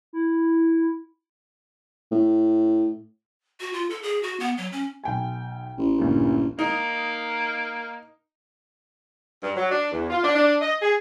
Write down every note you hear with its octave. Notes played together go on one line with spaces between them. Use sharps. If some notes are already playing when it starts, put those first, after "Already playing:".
E4
A2
F#4
F4
A4
G#4
F#4
B3
F#3
C#4
B1 G5 G#5
A1
D2 G2 A#2
A#3 D#4
G2
F#3
D4
E2
F4
D4
D4
D#5
G#4